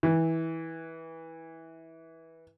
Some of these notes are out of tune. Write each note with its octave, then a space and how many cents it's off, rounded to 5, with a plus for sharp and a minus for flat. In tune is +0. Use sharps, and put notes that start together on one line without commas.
E3 -20